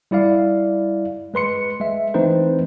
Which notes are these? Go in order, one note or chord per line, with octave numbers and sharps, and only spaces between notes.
G3 E4 D5 F5
G#3 B4 C6 C#7
G#3 E5
E3 A3 C4 D#4 B4 C5